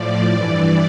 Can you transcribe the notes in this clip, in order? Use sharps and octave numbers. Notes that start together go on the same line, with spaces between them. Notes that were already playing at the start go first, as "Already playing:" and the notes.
Already playing: A2 F3 D5
G2 E3